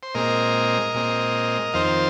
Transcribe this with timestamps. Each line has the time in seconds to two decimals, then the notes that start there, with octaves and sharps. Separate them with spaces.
0.03 C5
0.14 A#2 G#3 C4 A#4 D#5
0.94 A#2 G#3 C4
1.74 F2 D#3 C4 C5 F5